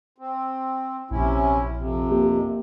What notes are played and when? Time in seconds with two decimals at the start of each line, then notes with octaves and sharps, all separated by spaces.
0.18 C4
1.11 A#1 C3 C#4 E4
1.77 F2 C3
2.11 A#3 G4